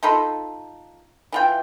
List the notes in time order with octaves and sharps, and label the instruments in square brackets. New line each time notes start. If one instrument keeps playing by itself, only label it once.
[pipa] D#4 F4 A4 B5
E3 F4 G5